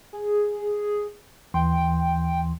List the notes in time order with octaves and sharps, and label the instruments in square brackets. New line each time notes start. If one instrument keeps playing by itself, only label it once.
[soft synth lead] G#4
[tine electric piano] D#2 E3 C6 [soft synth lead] G5